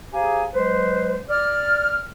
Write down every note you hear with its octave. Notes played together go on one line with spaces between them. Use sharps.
G4 G#4 C5 F5 G#5 A#5
F#3 G#3 B4 C5
D5 F6